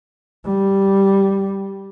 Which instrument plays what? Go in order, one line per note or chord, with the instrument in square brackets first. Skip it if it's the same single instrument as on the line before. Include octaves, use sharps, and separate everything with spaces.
[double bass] G3